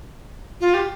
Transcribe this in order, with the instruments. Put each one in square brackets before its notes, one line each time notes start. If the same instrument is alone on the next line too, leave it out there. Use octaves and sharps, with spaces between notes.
[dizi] F4
G4